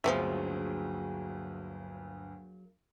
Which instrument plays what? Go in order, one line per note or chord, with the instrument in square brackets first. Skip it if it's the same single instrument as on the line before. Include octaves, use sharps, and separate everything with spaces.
[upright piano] G1 D2 [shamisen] F3 B3 E5 [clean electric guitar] F#3 A#3 G#4